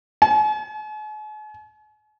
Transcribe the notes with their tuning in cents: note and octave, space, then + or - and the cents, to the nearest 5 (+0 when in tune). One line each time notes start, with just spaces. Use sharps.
G#5 +45